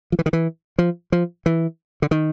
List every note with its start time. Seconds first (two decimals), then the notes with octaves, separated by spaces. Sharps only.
0.12 F3
0.19 E3
0.26 D#3
0.33 E3
0.78 F3
1.12 F3
1.46 E3
2.02 D3
2.11 D#3